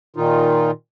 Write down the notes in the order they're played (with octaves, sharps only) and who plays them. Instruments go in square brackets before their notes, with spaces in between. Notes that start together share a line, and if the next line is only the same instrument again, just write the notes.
[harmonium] A#2 D#3 D#4 F4